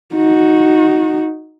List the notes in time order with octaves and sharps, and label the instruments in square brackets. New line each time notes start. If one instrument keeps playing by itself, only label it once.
[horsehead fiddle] D#4 F#4